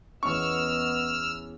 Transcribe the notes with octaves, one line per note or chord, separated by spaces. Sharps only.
E2 B3 C#4 D#5 C#6 E6 F6